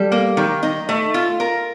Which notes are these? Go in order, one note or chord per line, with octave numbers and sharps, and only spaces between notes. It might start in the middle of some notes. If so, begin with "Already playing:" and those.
Already playing: G3 A4
A#3
D#3
D#4
A3
F4
A#4